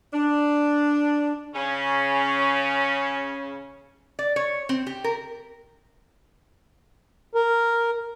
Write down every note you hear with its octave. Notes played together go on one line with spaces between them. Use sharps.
D4
C#3 C#4
D5
C#5
C4
G4
A#4
A#4